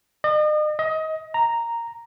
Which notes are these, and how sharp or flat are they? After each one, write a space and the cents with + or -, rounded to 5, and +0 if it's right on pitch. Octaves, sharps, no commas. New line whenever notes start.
D#5 -40
D#5 +25
A#5 -5